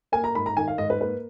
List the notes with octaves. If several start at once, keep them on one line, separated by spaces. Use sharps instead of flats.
A#3 G#5
A#5
G#2 B5
A#5
D#3 G#5
F5
G#2 D#5
B4
A#3 B4